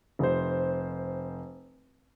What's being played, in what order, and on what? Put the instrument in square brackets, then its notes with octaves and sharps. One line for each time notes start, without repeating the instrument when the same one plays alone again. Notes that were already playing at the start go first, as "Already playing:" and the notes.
[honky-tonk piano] F1 C5